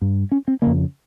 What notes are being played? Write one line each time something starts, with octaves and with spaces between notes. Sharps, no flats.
G2
C#4
C4
F2 C#3 A#3